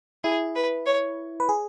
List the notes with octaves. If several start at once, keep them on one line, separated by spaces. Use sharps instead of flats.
E4 G#4
B4
C#5
B4
G#4